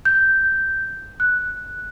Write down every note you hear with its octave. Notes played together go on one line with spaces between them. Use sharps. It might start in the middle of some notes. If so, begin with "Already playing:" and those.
G6
F#6